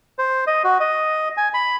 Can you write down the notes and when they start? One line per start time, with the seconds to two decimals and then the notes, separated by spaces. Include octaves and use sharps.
0.19 C5
0.47 D#5
0.64 F#4
0.80 D#5
1.37 G#5
1.54 B5